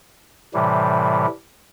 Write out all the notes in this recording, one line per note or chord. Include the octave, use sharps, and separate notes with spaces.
A2 C3 E3 G3